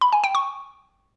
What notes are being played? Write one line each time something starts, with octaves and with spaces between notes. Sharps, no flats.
B5
G#5
G5
C#6